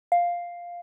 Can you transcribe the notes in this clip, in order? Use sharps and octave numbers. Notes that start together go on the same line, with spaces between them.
F5